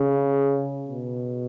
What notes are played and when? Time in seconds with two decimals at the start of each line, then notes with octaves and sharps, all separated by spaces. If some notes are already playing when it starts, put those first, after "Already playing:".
Already playing: C#3
0.88 B2